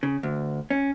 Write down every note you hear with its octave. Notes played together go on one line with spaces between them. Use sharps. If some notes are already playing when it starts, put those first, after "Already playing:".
C#3
D2
C#4